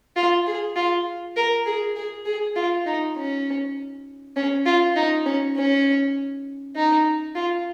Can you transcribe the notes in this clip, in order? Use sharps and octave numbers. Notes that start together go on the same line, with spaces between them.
F4
G#4
F4
A#4
G#4
G#4
G#4
F4
D#4
C#4
C#4
F4
D#4
C#4
C#4
D#4
F4